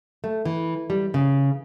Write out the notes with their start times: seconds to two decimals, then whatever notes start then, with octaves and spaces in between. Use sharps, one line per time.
0.24 A3
0.45 E3
0.90 G3
1.14 C#3